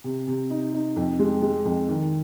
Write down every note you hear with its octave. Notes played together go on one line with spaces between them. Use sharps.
C3
C3
D#4
D#4
F2
G#3
G#3
F2
D#3